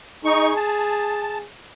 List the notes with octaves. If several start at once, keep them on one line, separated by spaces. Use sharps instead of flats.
D#4 G#4 C#6
A5